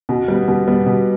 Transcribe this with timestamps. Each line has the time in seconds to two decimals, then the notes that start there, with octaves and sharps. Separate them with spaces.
0.09 B2
0.28 G3 B3
0.48 B2
0.67 G3 B3
0.86 B2